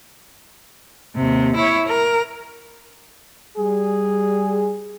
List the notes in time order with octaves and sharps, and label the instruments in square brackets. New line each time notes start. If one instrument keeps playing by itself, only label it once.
[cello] D#2 C3
E4 C#5
A#4
[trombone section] G3 G#4